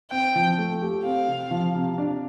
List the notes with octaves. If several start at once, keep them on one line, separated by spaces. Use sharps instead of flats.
C4 G5
F3
A3
G4
C4 F5
C3
F3
C3
D4